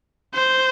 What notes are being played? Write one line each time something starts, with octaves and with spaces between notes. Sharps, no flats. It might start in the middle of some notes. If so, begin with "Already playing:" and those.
C5